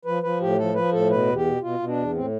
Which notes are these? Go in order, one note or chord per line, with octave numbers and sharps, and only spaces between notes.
F3 B4
F3 B4
A2 G4
F3 A4
F3 B4
A2 A4
B2 B4
E2
G4
B2
B2 F4
B2
D4
E2
A2 C4